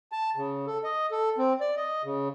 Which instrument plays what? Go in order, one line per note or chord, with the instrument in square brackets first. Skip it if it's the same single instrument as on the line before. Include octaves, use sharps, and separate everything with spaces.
[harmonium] A5
C#3
A4
D#5
A4
C4
D5
D#5
C#3